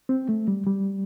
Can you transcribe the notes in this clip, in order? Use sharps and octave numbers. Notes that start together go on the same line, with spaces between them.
C4
A3
G3
G3